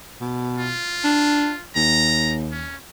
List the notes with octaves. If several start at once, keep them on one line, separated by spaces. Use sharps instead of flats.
B2
F4
D4
D#2 A#5
C#4